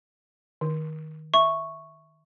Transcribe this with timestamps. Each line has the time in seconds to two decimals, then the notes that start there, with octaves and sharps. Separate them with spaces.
0.61 D#3
1.34 E5 C#6